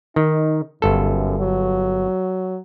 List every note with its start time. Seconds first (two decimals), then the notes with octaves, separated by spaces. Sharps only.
0.16 D#3 D#4
0.82 G1 F#2 A4
1.39 F#3